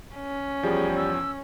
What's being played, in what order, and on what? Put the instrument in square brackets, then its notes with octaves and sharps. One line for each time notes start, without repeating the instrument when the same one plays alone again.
[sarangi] C#4
[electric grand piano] E2 F3 [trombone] G3 [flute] G#4
[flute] E6